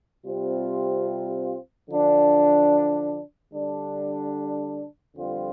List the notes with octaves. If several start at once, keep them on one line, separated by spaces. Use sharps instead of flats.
C3 G3 C4 F4
D3 F3 D4
D3 G3 D4
F2 D3 G3 C4 F4